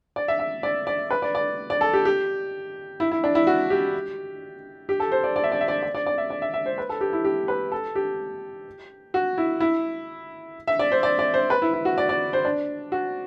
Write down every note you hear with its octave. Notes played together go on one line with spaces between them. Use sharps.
D5
E5
E5
D5
D5
B4
D5
D5
D5
A4
G4
G4
E4
E4
D4
E4
F#4
G4
G4
A4
C5
D5
D5
E5
D5
E5
D5
D5
D5
D5
E5
D5
E5
E5
C5
B4
A4
G4
E4
G4
B4
A4
G4
F#4
E4
E4
E5
D5
C5
D5
D5
C5
B4
E4
E4
F#4
D5
D5
C5
D4
F#4